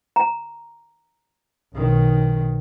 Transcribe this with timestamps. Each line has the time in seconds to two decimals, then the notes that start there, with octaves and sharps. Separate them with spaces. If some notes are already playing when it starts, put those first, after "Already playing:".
0.16 A#5
1.74 B1 D#3